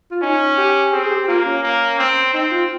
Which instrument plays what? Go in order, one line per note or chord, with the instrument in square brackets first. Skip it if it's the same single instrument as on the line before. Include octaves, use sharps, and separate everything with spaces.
[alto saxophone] F4
[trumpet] C#4 [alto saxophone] D#4
[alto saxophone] G4
[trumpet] C4 [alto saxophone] G#4
[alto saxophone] G#4
G4
[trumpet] A#3 [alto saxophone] F4
[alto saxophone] C#4
[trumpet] A#3
C4
[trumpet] C4 [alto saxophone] D#4
[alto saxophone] F4